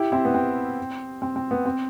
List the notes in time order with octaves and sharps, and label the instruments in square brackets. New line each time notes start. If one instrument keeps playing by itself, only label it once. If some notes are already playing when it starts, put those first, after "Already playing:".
Already playing: [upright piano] E4 G4
C4 E4
B3
C4
C4
C4
B3
C4